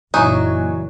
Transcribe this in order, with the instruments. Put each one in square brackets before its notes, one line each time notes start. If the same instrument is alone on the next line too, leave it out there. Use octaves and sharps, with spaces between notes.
[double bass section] F#1 [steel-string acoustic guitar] A#2 E3 F#3 [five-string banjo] D#4 [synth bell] G#5 C#6 F#6